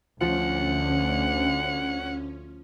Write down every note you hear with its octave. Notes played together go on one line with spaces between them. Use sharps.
D2 D3 F3 C#4 F#5